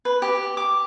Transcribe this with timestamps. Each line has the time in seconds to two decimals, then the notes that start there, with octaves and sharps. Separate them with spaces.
0.05 B4
0.22 G4
0.57 D6